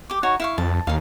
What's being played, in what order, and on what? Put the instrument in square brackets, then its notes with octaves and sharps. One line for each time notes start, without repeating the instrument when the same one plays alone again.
[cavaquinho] G4 D6
D#4 F#4 C#5
E4 F5 C#6
[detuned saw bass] F2 [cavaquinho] A5
[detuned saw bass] D#2 [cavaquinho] D#4 F5